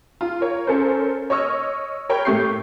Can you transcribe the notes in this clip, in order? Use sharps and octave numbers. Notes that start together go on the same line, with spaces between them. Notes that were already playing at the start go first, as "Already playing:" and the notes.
F4
A#4 C#5
C#4 A4 A#4 C5
C#5 D#5 C#6 E6 F6
A#4 C#5 G5 B5
A2 A3 G4 C#6 G6 C7